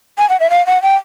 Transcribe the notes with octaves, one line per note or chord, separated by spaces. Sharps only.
G#5
F#5
E5
F5
F#5
G5